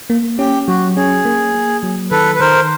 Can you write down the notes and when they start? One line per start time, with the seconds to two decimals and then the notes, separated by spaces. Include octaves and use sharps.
0.10 A#3
0.39 C#4 G4
0.68 F#3 F#4
0.96 C#4 G#4
1.25 A#3
1.54 A#3
1.83 F#3
2.11 D#3 A4 B4
2.35 B4
2.40 D#3 A#4 C5